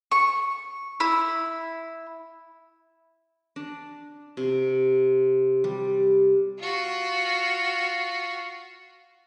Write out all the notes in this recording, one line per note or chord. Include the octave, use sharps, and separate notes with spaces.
C#6
E4
D4
C3
G3
F4 F#4